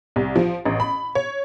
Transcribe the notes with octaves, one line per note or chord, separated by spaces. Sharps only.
C2
F3
A1
B5
C#5